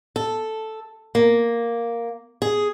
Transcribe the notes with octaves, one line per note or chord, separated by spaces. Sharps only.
A4
A#3
G#4